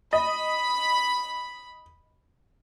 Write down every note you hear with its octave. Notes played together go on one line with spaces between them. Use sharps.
D#5 B5